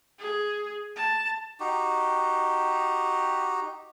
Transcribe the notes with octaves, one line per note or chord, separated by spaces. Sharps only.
G#4
A5
D#4 F#4 G4